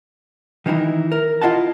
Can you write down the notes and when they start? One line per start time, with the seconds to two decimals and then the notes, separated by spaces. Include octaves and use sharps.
0.66 D#3 E3 D#4 E4
1.12 A#4
1.42 E4 F4 D#5 F#5 A5